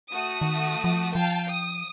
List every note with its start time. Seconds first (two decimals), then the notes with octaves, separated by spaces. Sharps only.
0.11 A3 F#4 D#6
0.41 D#3
0.84 F3
1.15 F3 F5 G5 A5
1.50 D#6